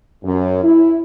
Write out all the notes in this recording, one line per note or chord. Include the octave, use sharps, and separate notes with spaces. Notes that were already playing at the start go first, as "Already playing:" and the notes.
F#2
E4